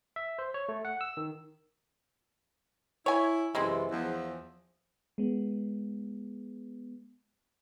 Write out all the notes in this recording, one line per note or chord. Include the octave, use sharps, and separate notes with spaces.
E5
C5
C#5
A3
F#5
E6
D#3
E4 C#5 G#5
F#2 C3 E3 G#3 C4 E4
E2 F3
G#3 B3